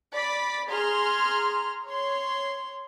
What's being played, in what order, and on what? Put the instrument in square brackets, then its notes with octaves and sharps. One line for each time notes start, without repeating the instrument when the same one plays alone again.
[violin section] D5 B5 B6
G#4 A#5 C6 F6
C#5 C6